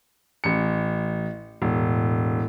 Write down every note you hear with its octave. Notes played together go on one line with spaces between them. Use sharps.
A1 C#7
E1 A2